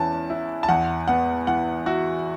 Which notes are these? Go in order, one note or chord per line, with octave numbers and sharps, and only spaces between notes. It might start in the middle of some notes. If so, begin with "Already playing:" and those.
Already playing: E2 E3 C#4 A5
E4
A5
E2 F#5
B3 F#5
E3 F#5
E4 F#4